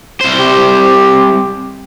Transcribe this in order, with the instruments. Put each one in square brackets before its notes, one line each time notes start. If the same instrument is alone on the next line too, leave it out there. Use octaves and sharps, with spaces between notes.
[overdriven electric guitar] C2 C5
[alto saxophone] G4